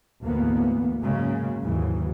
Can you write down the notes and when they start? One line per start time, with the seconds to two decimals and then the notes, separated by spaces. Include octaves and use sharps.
0.23 D2 G#2 E3 A#3 B3
1.02 G#2 C#3 F#3 G#3 A#3
1.62 D#2 G#2 C#3 E3 F#3